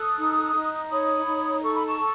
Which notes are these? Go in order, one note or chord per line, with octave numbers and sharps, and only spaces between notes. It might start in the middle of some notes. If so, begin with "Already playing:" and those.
Already playing: A4 D#6 F#6
D#4
D#4
C#5 B5 D#6
D#4
A4 C#6
B5
A5 C#6
A4